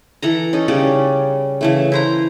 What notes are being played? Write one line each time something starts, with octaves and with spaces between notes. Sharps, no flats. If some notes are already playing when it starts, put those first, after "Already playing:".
E3 A4 A#5
C#4 D#4 A4
C#3 G3 C#4 D5
C#3 E3 A3
E4 C5 A#5